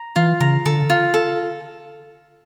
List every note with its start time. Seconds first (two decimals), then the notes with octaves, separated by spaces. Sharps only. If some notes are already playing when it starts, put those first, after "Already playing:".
Already playing: A#5
0.16 E3 F4
0.40 C#3 A#5
0.66 D3 A4
0.90 F4
1.14 A4